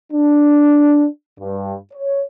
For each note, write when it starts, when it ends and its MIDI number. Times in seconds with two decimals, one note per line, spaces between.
0.13 1.06 62
1.39 1.75 43
1.93 2.22 73